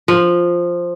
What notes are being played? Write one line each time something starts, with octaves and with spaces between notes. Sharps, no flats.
F3